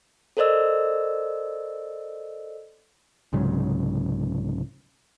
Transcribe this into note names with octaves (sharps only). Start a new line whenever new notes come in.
A4 A#4 C5 D5 D#5 E6
C2 G#2 C#3 F#3